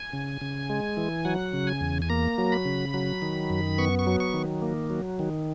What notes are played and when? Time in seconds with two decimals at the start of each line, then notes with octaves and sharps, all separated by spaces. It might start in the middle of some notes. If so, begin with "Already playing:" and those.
Already playing: G#5
0.13 C#3
0.41 C#3
0.69 G#3
0.97 E3
1.25 F#3 F#5
1.53 C#3
1.67 G#5
1.81 E2
2.02 G#5
2.10 A#3 A#5
2.38 F#3
2.52 B5
2.65 C#3
2.94 F#3
3.22 D#3
3.50 F#2
3.78 B3 C#6
3.99 C#6
4.07 F#3
4.20 C#6
4.34 D#3
4.62 A#3
4.90 F#3
5.19 D#3